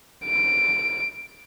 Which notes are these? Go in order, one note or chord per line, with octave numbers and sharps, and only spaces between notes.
D7